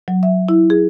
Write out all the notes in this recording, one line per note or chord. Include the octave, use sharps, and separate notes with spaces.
F#3
E5
E4
G#4